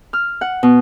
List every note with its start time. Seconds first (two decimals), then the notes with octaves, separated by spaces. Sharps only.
0.13 F6
0.41 F#5
0.63 B2